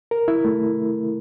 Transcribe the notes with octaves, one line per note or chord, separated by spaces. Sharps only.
A#4
E4
A3